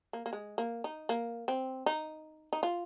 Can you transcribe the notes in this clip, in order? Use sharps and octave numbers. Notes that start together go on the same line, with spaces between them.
A#3
A#3
G#3
A#3
D#4
A#3
C4
D#4
D#4
F4